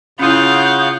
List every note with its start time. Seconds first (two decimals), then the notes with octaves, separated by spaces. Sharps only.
0.19 C#3 C#4 E4 F4 F#5 D#6 G6